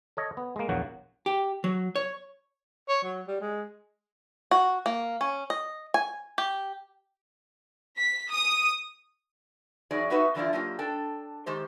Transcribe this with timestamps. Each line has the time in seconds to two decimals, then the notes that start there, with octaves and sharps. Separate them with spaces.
0.17 A4 C#5 D#5
0.37 B3
0.56 G#3 A#3
0.69 A#1 E2 F#3 A#3 F#4
1.26 G4
1.64 F#3
1.96 C#5
2.88 C#5
3.03 F#3
3.27 G3
3.41 G#3
4.51 F#4
4.86 A#3
5.21 C#4
5.50 D#5
5.94 G#5
6.38 G4
7.97 B6
8.30 D#6
9.91 E2 F#3 D#4 G#4 D5
10.10 B3 D#4 F#4 B4 E5 F#5
10.35 D3 E3 G3 D4 E4 F4
10.53 F#3 A#3 F4 G4
10.79 D4 A4 G5
11.46 D#3 G#3 G4 C5